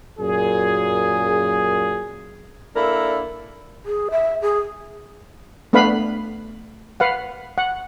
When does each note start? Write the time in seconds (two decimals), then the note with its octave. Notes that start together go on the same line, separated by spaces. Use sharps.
0.19 F#2 A#2 G#4
2.76 A#3 D4 E4 A4 A#4
3.86 G#4
4.11 E5
4.42 G#4
5.73 A3 B3 D4 B4 F5 B5
7.00 B4 F5 F#5
7.58 F#5